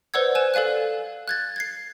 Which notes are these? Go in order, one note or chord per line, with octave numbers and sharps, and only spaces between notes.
B4 C5 D5 F#5 E6 G#6
C5 G#5 F#6 E7
A4 D5 F5 G#5 F#6
F#6 G#6 A6
G#6 A6 C7